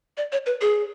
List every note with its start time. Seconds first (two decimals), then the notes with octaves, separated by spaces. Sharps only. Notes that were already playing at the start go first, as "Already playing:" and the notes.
0.17 D5
0.32 C#5
0.46 B4
0.61 G#4